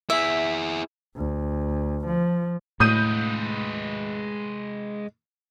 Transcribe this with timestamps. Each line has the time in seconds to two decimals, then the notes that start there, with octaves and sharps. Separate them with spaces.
0.10 E4 G#4 E5
1.16 D2
2.07 F3
2.80 A2 G#3 B4 D#6 G6 D#7